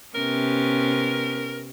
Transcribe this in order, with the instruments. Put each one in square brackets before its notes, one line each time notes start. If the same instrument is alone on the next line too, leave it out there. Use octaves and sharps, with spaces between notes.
[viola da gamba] C3 B3 C#4 [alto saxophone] A#4